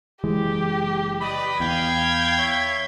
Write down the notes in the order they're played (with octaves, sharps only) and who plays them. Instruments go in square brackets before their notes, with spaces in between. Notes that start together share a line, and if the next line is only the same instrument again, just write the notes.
[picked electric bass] F#1 E3 G#3 [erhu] G4
[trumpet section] B4 D5 D#5 [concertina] B5
[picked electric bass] E2 [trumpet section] F5 G5 [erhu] G#6
[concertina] C#5 E5